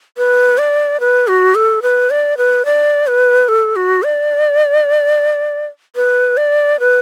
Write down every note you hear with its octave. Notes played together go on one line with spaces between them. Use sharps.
B4
D5
B4
F#4
A4
B4
D5
B4
D5
B4
A4
F#4
D5
B4
D5
B4